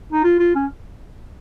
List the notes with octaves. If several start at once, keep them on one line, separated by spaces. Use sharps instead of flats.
D#4
F4
F4
C#4